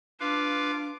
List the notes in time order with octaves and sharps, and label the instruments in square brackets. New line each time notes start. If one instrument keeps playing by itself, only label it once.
[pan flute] D4 [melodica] F4 [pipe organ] B4 F5 [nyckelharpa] D6